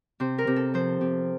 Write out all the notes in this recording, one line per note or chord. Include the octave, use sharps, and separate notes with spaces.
C3 C5
A#4
C3
A4
F3 C5
C3